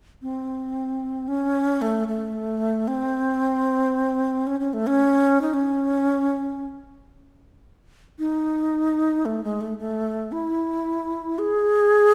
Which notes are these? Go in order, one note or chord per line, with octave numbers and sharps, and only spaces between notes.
C4
C#4
A3
A3
C4
C#4
C#4
A3
C#4
D#4
C#4
D#4
A3
G#3
A3
A3
E4
G#4